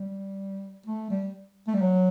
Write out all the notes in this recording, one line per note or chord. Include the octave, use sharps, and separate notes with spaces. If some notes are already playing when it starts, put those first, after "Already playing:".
Already playing: G3
A3
G3
A3
G3
F#3